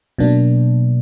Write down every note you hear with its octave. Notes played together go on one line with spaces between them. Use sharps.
B2 F#3 A#3 D4